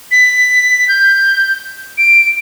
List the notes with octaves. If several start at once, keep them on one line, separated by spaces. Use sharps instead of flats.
B6
G6
D7